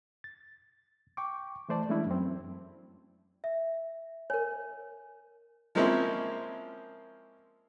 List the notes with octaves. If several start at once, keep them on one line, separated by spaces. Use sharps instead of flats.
A6
G5 C#6 D6
E3 A3 C5 D5 A5
E3 G#3 A3 C#4 D4 E4
F#2 C4
E5
A#4 C#5 G#5
F3 G#3 A#3 C4 C#4 E4